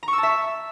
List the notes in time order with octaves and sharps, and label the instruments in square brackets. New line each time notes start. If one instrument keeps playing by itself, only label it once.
[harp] A#5
C#6
E6
A5
E5